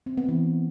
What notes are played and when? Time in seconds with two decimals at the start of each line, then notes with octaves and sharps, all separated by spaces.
0.06 C4
0.17 B3
0.29 E3